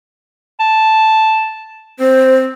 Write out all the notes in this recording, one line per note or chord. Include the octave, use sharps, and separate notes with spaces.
A5
C4 C5